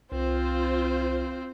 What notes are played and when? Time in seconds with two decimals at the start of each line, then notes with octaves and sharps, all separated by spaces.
0.12 C2 C4 F4 C5